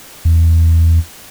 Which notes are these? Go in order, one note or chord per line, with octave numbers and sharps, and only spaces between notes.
E2